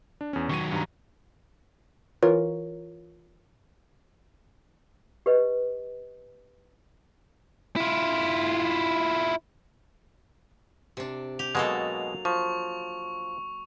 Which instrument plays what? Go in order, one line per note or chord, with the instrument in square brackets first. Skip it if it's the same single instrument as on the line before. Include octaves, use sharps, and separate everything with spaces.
[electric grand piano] D4
E2 C#4
[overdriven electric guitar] D#3 F#3 [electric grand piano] C#6 D#7
[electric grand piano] G2 A#5
[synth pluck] E3 F4 A#4 C#5
[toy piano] G4 B4 D#5
[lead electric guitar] E4 F4
[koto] C3 D4
[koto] G4 [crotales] F7
[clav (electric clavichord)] B2 G#3 [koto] F#3 A#3 A4
[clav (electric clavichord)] F3 [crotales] C#6